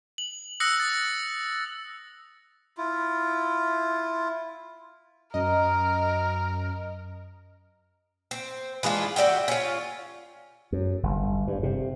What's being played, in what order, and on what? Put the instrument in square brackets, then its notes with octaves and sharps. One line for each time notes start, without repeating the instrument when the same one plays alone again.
[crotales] F#7
D#6 E6 F#6 A#6 C#7
A6
[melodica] E4 F4
[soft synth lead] F#2 [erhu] A#4 [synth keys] D#5
[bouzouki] C4
E3 G#3 D4 F4
F#4 D5 E5 G5
C#4 F4
[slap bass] F#2
G1
G2
C3